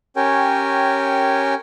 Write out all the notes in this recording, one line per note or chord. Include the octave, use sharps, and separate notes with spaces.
C#4 G4 A#4 C#5 G5 G#5